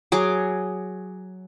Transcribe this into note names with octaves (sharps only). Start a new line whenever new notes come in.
F#3 G#4 D6